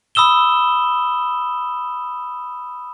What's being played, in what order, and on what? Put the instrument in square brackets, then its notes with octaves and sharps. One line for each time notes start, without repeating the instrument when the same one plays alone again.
[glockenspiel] B5 D#6 E6 E7 G7